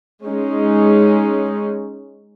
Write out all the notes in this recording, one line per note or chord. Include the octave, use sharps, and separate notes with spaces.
G#3 C#4 D#4